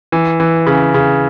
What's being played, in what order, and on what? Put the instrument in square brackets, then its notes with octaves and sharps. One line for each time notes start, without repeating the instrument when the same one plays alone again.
[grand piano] E3
E3
C#3
C#3